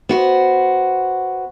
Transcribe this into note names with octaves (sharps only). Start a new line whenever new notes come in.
B3 F#4 C5